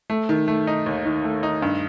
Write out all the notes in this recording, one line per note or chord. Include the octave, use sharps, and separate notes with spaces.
A3
D#3
A3
D#4
D#2
D#3
A3
D#4
G2